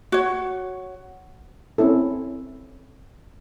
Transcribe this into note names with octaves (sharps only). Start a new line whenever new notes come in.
F#4 C#5
C4 C#4 E4 A4